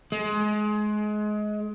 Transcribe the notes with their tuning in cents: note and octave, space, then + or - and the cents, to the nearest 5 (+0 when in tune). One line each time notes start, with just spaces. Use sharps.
G#3 +25